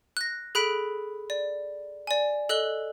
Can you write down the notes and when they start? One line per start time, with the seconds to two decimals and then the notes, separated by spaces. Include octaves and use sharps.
0.17 F#6 A#6
0.55 G#4 A4 B5 F#6 B6 D7
1.30 D5
2.07 D5 G#5
2.49 A4 D#5 F#6 F#7 G7